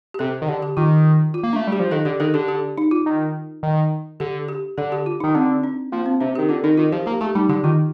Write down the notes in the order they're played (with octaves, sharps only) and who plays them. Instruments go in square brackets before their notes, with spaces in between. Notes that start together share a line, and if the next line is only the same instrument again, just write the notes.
[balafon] G4
[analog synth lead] C3 [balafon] A4
[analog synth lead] D#3
[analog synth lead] D3 [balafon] G4
[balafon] G4
[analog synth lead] D#3 [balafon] F4
[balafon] F4
[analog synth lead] A#3
[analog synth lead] A3 [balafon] D4
[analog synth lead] G3 [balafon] G4
[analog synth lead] F3
[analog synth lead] D#3 [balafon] A4
[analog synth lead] D3 [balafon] G4
[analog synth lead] D#3 [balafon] A4
[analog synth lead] D3 [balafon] G4
[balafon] G4
D#4
F4
[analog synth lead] D#3
D#3
[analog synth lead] D3 [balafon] G4
[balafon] G4
[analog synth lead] D3 [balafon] A4
[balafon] G4
F4
[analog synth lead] D#3 [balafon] D#4
[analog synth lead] D3 [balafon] C4
[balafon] D4
[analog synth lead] F3 [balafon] A#3
[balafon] C4
[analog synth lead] C3 [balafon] D4
[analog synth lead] D#3 [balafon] G4
[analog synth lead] D3 [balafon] F4
[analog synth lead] D#3 [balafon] D#4
[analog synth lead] D#3 [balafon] F4
[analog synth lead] F3 [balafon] G4
[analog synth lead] A#3 [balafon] G4
[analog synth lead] A3 [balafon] G4
[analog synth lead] G3 [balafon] D#4
[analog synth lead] D3 [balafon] G4
[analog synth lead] D#3 [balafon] F4